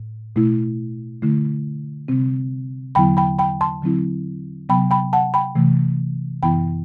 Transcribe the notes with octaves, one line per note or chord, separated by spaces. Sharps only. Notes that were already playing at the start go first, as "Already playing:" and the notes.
Already playing: A2
B2 A3 E4
D3 A3 E4
C3 G3 C4
E2 D3 F#3 B3 E4 G5 B5
G5 B5
G5 B5
A5 C6
D3 F#3 C4 E4
C3 F#3 B3 G5 B5
G5 B5
F#5 A5
G5 B5
C3 E3 A3
F#2 E3 B3 E4 G5 B5